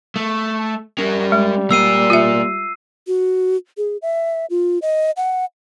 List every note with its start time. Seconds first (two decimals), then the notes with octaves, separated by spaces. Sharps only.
0.16 A3
0.98 G3 C#4 A#4
1.32 G#3
1.71 A#3 D5 E6 C7 D#7
2.10 F4 E5
3.07 F#4
3.78 G#4
4.02 E5
4.50 F4
4.82 D#5
5.17 F#5